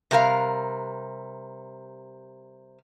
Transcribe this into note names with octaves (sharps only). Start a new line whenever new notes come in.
C3 G3 A#4 F5